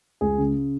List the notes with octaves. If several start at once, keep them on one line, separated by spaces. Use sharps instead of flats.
C#2 G#4
C#3